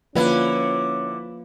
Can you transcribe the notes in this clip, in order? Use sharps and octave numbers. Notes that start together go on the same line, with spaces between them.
D3 F3 A#3 C#4 E4 B4